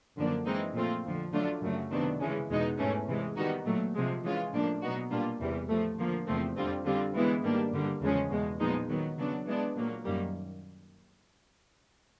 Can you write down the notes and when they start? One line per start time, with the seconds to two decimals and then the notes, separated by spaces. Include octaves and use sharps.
0.16 F#2 D3 F3 A#3 D4
0.46 E3 G#3 C4 D#4
0.74 A#2 F3 A3 C4 F4
1.04 F2 D3 F3
1.33 D3 F#3 A3 D4 F4
1.62 F#2 C#3 F#3 A3
1.91 C3 D#3 F#3 B3 D4
2.20 C#3 E3 G#3 C#4
2.49 E2 B2 G#3 B3 D#4
2.78 G#2 E3 A3 C#4
3.07 C3 E3 G#3
3.36 D#3 G3 B3 D#4 F#4
3.65 A#2 F#3 A3
3.94 C3 F3 G#3
4.24 E3 G#3 C#4 F4
4.53 A2 F3 A#3 D4
4.82 B2 F#3 B3 D#4 F#4
5.11 A#2 G3 A#3 D4 F4
5.40 E2 C3 E3 G3
5.69 A2 F3 A3
5.98 D3 F3 A#3
6.27 E2 C3 F3 A3 C4
6.56 F2 D3 G3 C4 F4
6.86 D3 G3 C4 F4
7.15 E3 G#3 B3 E4
7.43 G#2 D#3 G3 A#3 D4
7.72 G2 D3 G3 A#3
8.01 E2 C#3 F3 G#3 C#4
8.30 E2 B2 G#3
8.60 A#2 F3 G#3 B3 D#4
8.89 D#3 F#3 B3
9.18 C#3 F#3 B3 D4
9.47 E3 G#3 B3 D4
9.76 A#2 F#3 A#3
10.05 F#2 D#3 G3 A#3